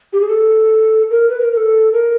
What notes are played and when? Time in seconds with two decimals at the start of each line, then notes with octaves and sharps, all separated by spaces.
0.13 G4
0.21 G#4
0.29 A4
1.10 A#4
1.30 B4
1.41 A#4
1.52 A#4
1.57 A4
1.93 A#4